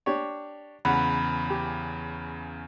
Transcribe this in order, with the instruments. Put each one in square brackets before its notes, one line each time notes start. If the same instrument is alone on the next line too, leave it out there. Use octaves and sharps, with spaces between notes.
[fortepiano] D4 G4 C#5
[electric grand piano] E2 C#3 [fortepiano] F#5 [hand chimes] B5
[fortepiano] G4